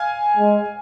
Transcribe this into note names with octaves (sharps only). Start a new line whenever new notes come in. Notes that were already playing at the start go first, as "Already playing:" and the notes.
Already playing: F5 G#5
G#3